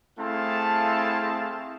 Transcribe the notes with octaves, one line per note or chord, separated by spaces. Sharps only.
A3 C4 E4 G#4 F5 A5